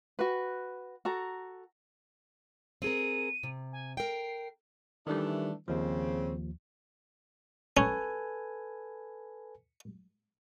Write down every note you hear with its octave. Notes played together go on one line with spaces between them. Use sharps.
F#4 B4
F#4 A4 A#5
C4 G#4 A#4 D#7
C3
G#5
A#4 G5 C7
D#3 E3 G3 A3 D4
D#2 C#3 F3 C4
C#4 A4 B4 G#5